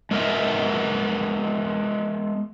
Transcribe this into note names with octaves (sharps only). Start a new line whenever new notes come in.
G#3 B3 A#4 D#5 E5